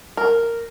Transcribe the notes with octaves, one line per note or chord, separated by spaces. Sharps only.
A#4